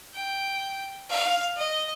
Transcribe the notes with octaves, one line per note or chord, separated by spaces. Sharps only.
G5
F5
D#5